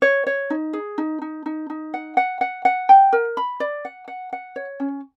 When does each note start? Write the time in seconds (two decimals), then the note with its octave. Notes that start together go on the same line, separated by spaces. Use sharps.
0.02 C#5
0.27 C#5
0.50 D#4
0.73 G#4
0.98 D#4
1.22 D#4
1.46 D#4
1.70 D#4
1.94 F#5
2.17 F#5
2.41 F#5
2.65 F#5
2.89 G5
3.13 A#4
3.37 B5
3.60 D5
3.85 F#5
4.08 F#5
4.33 F#5
4.56 C#5
4.80 C#4